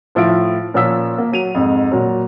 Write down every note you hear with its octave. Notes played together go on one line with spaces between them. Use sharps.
A2 F3 E4 F4 D7
A#2 F3 C#4 F4 E6 B6
A#3
F#3 D#7 F7
F2 G#2
A#2 F#3